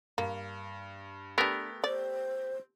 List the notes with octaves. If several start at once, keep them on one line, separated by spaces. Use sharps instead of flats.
G2 A#3
A3 B3 D4 G4 A#4 B4
C5 D5